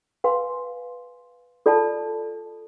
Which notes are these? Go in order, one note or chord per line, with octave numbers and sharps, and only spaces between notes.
B4 F5 G#5 C6
F4 A4 D5 A5